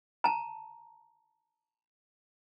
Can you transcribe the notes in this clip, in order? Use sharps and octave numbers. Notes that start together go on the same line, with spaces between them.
A5 A#5